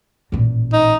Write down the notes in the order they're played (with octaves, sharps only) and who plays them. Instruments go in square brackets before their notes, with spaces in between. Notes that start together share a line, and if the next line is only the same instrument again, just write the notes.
[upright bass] A1 A#2
[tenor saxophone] D#4